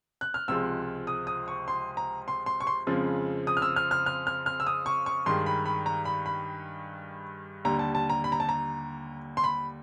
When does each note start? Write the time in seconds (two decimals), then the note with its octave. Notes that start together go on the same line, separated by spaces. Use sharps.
0.21 F#6
0.34 F6
0.48 C#2 C3 F3 G#3 E6
1.07 D#6
1.27 D#6
1.48 C#6
1.68 C6
1.97 A#5
2.28 C6
2.46 C6
2.60 C#6
2.67 C6
2.87 F2 C#3 F3 G#3
3.47 D#6
3.57 F6
3.62 E6
3.76 F6
3.91 F6
4.06 F6
4.27 F6
4.46 F6
4.60 E6
4.67 D#6
4.86 C#6
5.06 C#6
5.26 G2 D#3 G#3 C6
5.46 B5
5.66 B5
5.86 A#5
6.05 B5
6.26 B5
7.65 D#2 D3 G3 A#5
7.79 A5
7.95 A5
8.10 A#5
8.24 B5
8.32 A#5
8.40 A5
8.49 A#5
9.37 C6
9.44 B5